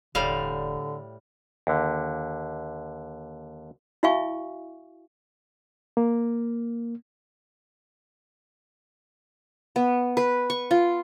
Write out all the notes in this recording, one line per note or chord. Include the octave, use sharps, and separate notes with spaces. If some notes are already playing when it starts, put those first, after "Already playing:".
E1 A2 D3 G3 F5
D#2 D3
E4 F#4 E5 F5 G#5 C#6
A#3
B3
B4
C#6
F4